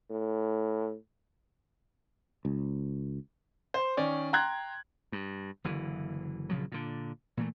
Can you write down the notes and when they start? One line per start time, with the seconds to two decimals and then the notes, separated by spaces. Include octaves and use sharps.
0.11 A2
2.45 C#2
3.74 C5
3.97 D#3 C#4 D5
4.33 G5 A#5 C6 F#6 G#6
5.12 G2
5.64 F#1 D3 E3
6.49 A#1 C#3 F3 F#3
6.72 A#2 D3
7.37 A#2 E3 A3